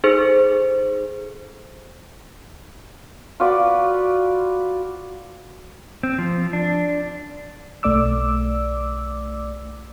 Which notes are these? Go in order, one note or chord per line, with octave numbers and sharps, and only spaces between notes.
D#4 G#4 A4 C5
F4 F#4 B4 D5
C4
F3
D4
B1 A3 D5 D6 E6